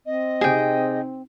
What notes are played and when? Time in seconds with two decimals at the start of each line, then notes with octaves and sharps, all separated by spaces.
0.06 C4 D#5
0.41 C3 D#4 G4 G#4 G5